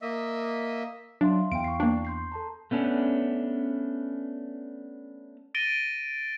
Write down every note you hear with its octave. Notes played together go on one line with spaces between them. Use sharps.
A#3 D#5 E5
F#3 D4 E5 F5 C6
E2 F5 G5 D7
C#6 C7
A#3 D4
C6 G6 C7
A4 A5 A#5
A3 B3 C#4 D4
A6 A#6 D7 D#7 G7